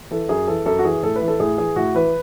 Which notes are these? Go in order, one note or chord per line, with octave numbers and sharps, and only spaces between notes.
E3 A4
F#2 G#4
E3 A4
F#2 A4
F#4
E3 G#4
A2 A4
B4
E3
A4
A2 G#4
E3 G#4
A2 F#4
E3 B4